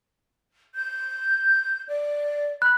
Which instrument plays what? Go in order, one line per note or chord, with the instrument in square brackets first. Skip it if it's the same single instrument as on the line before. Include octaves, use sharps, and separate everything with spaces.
[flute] G6
D5
[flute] B5 [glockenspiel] F#6